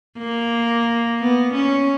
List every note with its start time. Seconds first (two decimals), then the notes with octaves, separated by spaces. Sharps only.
0.18 A#3
1.21 B3
1.54 C#4